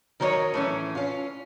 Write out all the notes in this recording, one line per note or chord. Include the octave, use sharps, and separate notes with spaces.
D#3 F#3 A#4 C5 C#5 D#5
A2 E3 C#4
C#4 F4